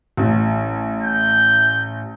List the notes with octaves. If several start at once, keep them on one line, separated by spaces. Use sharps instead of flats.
A1
G6